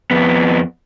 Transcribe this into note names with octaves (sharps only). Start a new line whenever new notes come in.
F2 B3